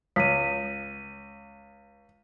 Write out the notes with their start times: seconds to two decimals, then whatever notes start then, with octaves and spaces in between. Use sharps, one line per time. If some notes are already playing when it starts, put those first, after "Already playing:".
0.16 C#2 B6 D#7